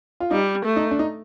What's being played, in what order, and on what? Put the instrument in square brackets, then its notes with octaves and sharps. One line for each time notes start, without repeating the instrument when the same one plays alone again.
[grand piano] F4
[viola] G3 [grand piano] D#4
[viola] A3
[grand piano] D#4
D4
D#4